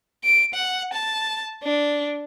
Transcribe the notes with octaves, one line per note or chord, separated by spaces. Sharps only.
D7
F#5
A5
D4